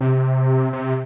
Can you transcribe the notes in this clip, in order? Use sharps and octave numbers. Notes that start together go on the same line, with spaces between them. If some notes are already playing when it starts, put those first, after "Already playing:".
C3
C3